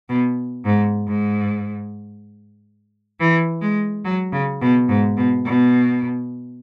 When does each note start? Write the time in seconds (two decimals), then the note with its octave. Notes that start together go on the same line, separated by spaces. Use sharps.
0.09 B2
0.66 G#2
1.07 G#2
3.20 E3
3.61 G#3
4.05 F#3
4.32 C#3
4.61 B2
4.89 G#2
5.17 B2
5.45 B2